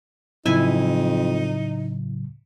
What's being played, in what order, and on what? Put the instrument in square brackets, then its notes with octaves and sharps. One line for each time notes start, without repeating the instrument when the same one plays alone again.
[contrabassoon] F2 [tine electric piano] A2 C#3 F#3 [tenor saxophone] D#4 [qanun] E4 G#5